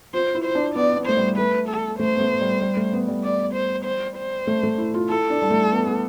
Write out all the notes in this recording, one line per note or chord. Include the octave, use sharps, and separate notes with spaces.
F4 C5
E4
C5
D4
B3 D5
B3
A3 C5
G3
A3 B4
A4
A3 C5
B3
A3
G3
G3
A3
B3
G3
D5
C5
C5
C5
A3
A3
E4
F4
E4 A4
D4
G3
A3
B3
B3